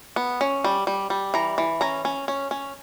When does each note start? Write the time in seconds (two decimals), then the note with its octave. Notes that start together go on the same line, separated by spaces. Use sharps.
0.16 B3
0.41 C#4
0.64 G3
0.87 G3
1.10 G3
1.34 E3 A#5
1.58 E3
1.81 C#4 A#5
2.05 C#4
2.28 C#4
2.51 C#4